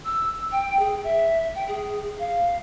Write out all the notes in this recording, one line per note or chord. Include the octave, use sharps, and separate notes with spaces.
E6
G5
G#4
E5
G5
G#4
F5